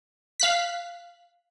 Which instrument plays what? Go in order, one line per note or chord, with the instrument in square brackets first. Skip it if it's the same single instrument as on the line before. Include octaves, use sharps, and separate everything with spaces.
[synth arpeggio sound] F5 F#6 B6